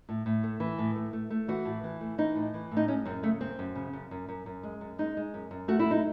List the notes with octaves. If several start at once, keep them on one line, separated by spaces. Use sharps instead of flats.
A2
A2
A3
E3
A2
A3
A3
A3
E3 F#4
A2
E3
A3
E3 D#4
A2
E3
A2
D#4
G#3 C#4
F#2 C4
C#3 A3
F#2 C4
F#2
C#3
F#2
F#2
F#2
F#2
G#3
F#2
G#3 D#4
G#3
F#2
F#2
A3 F#4
E4
F#3
D#4